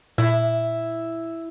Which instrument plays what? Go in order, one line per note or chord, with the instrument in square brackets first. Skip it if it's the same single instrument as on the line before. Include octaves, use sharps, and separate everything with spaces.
[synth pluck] A#2 [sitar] E4